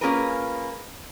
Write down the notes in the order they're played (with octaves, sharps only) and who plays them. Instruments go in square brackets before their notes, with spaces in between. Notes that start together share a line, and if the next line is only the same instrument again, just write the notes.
[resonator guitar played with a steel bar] A#3 C#4 F4 G#4 A#4 B4